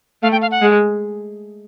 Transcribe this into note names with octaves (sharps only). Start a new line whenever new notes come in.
A3 F5
G5
F5
F#5
G#3